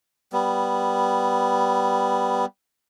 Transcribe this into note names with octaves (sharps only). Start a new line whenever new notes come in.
G3 B3